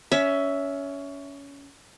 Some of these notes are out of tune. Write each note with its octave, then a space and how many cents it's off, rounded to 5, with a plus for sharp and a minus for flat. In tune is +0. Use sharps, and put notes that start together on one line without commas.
C#4 +20 E5 +0